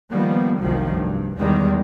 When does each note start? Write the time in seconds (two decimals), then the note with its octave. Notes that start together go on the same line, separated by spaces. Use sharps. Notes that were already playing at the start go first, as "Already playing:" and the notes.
0.11 D#3 F3 G3 A#3 B3
0.59 F1 C2 C3 D#3 F3 F#3
0.90 G2
1.37 E2 D#3 G3 G#3